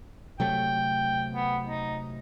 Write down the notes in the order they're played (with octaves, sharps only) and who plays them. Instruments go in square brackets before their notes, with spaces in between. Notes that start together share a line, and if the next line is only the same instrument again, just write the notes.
[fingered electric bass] C3 F#3 A3 [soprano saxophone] G5
[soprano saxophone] B3
D#4